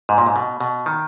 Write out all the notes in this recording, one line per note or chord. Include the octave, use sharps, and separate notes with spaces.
G#2
A#2
G#2
B2
B2
D#3